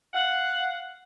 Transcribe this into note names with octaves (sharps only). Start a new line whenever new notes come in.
F5 F#5